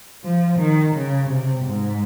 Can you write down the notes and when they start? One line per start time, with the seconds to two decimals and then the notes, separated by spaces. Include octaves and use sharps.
0.24 F3
0.59 D#3
0.96 C#3
1.30 C3
1.66 G#2